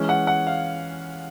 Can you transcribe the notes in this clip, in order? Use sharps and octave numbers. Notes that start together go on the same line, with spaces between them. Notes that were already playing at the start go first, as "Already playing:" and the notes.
Already playing: E3 G#3 C#4
F#5
F#5
F5